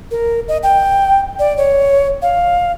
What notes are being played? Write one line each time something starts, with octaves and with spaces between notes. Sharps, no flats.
A#4
D#5
G5
D5
C#5
F5